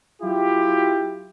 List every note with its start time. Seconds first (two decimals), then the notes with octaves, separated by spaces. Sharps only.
0.22 F#3 E4 F4 G4